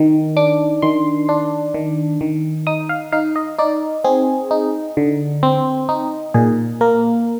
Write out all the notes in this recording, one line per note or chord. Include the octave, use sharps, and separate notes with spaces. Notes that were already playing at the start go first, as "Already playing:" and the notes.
Already playing: D#3
D4 D6
D#3 C6
D4
D#3
D#3
D#4 D#6
F5
D#4 F5
D#5
D#4 D5
C4 G#4
D#4
D3
C4
D#4
A#2 G#4
A#3 A#4